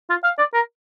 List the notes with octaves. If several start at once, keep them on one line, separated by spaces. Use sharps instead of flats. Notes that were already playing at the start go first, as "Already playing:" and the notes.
F4
F5
D5
A#4